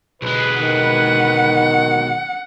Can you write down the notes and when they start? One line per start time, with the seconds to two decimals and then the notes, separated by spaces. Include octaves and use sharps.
0.22 B1 G#3 B4
0.61 D#3 F#5